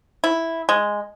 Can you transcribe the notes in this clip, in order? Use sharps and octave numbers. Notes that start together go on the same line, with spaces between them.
E4
G#3